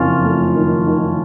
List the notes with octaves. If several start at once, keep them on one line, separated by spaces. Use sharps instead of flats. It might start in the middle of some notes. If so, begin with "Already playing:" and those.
Already playing: F#1 F2 C#4 F4
A3
D#3
D#3